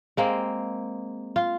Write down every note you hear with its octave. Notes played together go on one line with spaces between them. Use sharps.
G#3 A#3 C4
F4